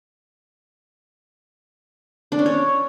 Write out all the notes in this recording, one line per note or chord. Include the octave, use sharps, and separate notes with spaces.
D4
C#4
C#5